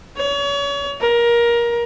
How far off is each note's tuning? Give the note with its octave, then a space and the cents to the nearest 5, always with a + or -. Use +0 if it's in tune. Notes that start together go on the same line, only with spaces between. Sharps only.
C#5 +35
A#4 +20